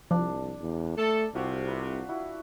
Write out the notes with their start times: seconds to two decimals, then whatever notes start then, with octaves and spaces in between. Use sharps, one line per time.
0.11 C2 F3 D4
0.60 E2
0.97 A3 A4
1.35 C2 C3 F4 F#4 F5
1.68 B4
2.09 E4 F#4